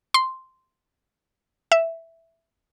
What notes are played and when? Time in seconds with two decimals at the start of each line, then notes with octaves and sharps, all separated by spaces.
0.14 C6
1.72 E5